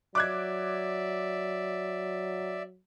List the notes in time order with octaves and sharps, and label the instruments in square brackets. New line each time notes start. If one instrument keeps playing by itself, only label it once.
[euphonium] F#3 [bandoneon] D5 E5 [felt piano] D6 F#6 G#6